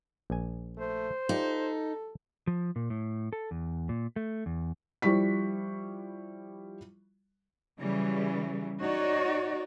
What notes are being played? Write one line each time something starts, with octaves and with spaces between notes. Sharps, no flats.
A#1 G#5
A3 C5
D#4 F4 G4 A4 D5
F3
A#2
A2
A4
E2
A#2
A3
E2
F3 G3 E4 C#6 B6
C#3 E3 F#3 G3
D#4 F#4 C#5 D5